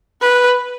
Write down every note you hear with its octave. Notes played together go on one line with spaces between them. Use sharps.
B4